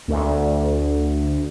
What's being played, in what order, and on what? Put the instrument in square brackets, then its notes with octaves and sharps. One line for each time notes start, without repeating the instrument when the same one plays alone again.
[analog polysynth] D2